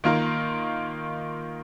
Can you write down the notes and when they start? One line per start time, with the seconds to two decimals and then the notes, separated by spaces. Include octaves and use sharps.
0.04 D#3 A#3 F4 A#4